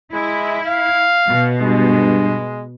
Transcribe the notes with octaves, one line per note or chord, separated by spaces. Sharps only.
G#3 E4
F5
B2
G2 G#3